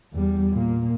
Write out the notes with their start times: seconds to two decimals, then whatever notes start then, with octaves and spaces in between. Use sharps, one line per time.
0.13 E2 G3
0.51 A#2 A#3